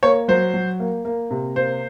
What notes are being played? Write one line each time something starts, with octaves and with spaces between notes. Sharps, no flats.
A#3 C#5
F#3 C5
F#3
A#3
A#3
C3
A#3 C5